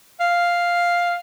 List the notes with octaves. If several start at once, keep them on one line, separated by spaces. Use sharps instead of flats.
F5